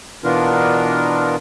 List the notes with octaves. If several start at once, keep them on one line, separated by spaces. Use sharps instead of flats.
B2 E3 B3 D4 F4 A#4